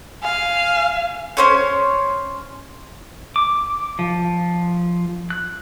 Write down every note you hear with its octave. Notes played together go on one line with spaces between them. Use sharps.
F5 G#5
C#4 C5 C#5
D6
F3
F#6